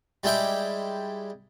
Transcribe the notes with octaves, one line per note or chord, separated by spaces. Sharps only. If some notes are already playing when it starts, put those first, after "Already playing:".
G3 G#3 E4 G5 D6